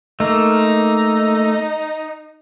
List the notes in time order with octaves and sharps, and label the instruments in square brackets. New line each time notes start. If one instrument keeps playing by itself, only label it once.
[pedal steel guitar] A3 A#3 [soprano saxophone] D#4